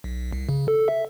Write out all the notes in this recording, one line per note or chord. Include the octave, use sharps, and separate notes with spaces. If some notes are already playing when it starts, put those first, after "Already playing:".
B1
C2
C#3
A4
E5